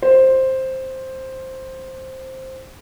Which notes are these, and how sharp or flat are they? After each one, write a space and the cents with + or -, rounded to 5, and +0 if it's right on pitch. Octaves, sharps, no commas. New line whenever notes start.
C5 +5